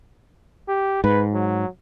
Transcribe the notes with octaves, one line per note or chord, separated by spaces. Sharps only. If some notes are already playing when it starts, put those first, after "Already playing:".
G4
G#2 B4
F#3